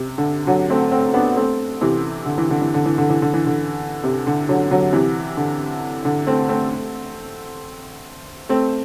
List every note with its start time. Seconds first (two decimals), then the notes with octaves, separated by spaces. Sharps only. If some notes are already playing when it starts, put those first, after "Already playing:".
Already playing: C3
0.18 D3
0.47 D3 F#3
0.70 A3 C4
0.92 A3 C4
1.14 B3 D4
1.36 A3 C4
1.81 C3 E3
2.26 D3
2.38 E3
2.50 D3
2.62 E3
2.74 D3
2.86 E3
2.98 D3
3.10 E3
3.22 D3
3.34 E3
3.46 D3
4.04 C3
4.27 D3
4.49 D3 F#3
4.71 D3 F#3
4.93 C3 E3
5.37 D3
6.05 D3
6.27 A3 C4
6.49 A3 C4
8.49 A3 C4